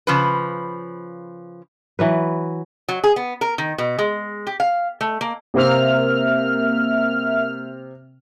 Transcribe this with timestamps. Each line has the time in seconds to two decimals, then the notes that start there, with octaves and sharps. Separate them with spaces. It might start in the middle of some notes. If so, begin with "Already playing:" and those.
0.07 C#3 F3 B4
1.99 E3 F#3 B4
2.88 F#3
3.04 G#4
3.16 B3
3.41 A#4
3.58 D#3
3.78 B2
3.99 G#3
4.47 G4
4.60 F5
5.01 A3
5.21 A#3
5.54 C3 A#3 C4 E5 F6